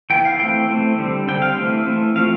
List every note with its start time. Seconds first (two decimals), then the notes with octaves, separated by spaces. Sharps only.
0.10 E3 B3 G5
0.25 F5
0.39 E3 A3 C4 G5
0.69 E3 A3 C4
0.98 D3 G3 C4
1.28 D3 G3 C4 G5
1.42 F5
1.57 E3 A3 C4
1.86 E3 A3 C4
2.16 F3 A3 C4 F5